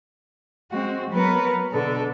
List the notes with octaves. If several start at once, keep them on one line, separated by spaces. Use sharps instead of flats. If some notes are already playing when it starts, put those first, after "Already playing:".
G#3 C4 F#4
F#3 B3 A#4 B4
B2 D3 A4